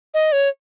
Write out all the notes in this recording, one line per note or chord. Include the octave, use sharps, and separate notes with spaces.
D#5
C#5